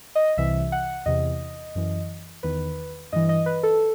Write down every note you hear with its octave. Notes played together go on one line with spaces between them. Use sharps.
D#5
C2 C3 E3 E5
F#5
E2 C3 E3 D#5
F#2 E3
E2 D#3 B4
G2 E3 D#5
D#5
B4
A4